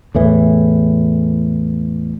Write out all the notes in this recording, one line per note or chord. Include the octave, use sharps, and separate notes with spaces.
E2 A2 E3